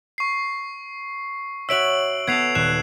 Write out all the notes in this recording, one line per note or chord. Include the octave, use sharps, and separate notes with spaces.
C#6 C7
F#4 C#5 E5 E6 D7 F#7
B3 A4 G#6 C7 F7
D#1 F#6 C7 E7